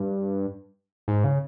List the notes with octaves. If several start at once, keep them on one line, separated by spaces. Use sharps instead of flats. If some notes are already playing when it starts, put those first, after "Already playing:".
Already playing: G2
G#2
C#3